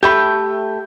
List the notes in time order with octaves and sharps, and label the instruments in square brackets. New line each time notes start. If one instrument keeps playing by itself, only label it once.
[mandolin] A3 G5 [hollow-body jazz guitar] G4 B5 [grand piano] G6